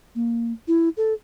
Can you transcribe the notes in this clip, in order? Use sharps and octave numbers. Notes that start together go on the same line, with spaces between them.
A#3
E4
A4